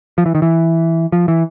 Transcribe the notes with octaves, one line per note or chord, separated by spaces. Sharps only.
F3
E3
D#3
E3
F3
E3